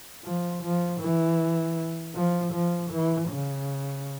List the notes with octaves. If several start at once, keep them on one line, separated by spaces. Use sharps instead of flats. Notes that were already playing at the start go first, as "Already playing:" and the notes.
F3
F3
E3
F3
F3
E3
C#3